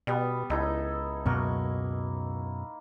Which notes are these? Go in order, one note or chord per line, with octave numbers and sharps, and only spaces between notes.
B2 G3 B3
C#2 D#4 E4 A4
F#2 B2 F#3 A#3 C#6